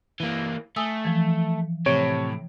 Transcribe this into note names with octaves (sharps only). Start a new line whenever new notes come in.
E3 A#3
A3 G#5 D#6 E6
E3 F3
A2 C3 C#5 D7